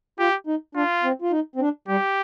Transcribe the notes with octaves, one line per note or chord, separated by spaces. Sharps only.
F4 G4
D#4
D4 F4
C4
F4
D#4
C4
D4
G3 G4